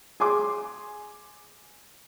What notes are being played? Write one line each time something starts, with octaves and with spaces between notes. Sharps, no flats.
G#4 G#5 C6 D6